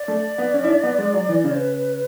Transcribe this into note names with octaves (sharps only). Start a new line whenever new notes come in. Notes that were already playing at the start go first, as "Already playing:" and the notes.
Already playing: D5
A3
B3
C#4
E4
D4
B3
G#3
F#3
E3
C#3
B4